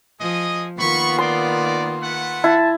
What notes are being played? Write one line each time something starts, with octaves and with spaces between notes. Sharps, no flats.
F3 G#4 D#5 D#6
D#3 A#3 B3 F4 B5 C#6
D#4 D5 C6
A3 B4 F#5
E4 A5